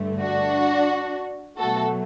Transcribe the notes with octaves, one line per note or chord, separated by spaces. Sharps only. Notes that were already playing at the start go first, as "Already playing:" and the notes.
Already playing: G2 D3 A3
D4 F#4
B2 F#3 A3 F#4 A4